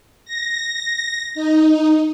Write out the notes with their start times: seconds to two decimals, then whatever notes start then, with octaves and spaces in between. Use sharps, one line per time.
0.25 A#6
1.35 D#4